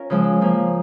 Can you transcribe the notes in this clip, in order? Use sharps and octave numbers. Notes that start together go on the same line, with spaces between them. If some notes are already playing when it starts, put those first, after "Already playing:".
Already playing: C#4 F4 A#4
C#3 F3 G#3
F3 A#3 C#4